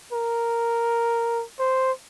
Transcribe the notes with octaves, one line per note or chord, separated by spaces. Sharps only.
A#4
C5